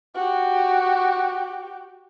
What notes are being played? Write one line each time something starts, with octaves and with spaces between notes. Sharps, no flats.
F#4 G4